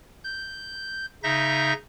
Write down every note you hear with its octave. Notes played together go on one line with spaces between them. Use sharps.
G6
C#3 D#4 E5 G6 A#6